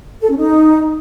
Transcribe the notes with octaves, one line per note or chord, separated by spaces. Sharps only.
A4
C#4
D#4